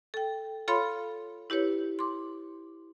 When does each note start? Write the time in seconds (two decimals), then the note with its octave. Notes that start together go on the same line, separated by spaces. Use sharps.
0.14 A4 G5
0.68 F4 A4 C#5 F5 B5 C6
1.50 E4 G4 B4 C#5
1.99 C6 D6